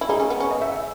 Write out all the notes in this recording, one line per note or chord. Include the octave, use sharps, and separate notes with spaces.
E4
D#4 G#4
C#4
B3
C#4
D#5
E5
E5